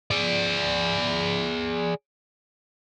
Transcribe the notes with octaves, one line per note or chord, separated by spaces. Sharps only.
G#4 D5